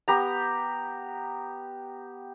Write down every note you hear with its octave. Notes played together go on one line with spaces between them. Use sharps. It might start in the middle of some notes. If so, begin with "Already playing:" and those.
B3 G4 A#5